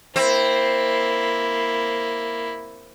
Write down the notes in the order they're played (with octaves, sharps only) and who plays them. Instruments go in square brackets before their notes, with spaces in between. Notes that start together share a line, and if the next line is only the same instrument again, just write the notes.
[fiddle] A#3 E4 [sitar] C4